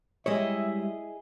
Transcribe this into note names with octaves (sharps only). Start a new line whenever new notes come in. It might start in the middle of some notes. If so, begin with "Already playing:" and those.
G3 G#3 E4 G#4 C#5 D#5 E5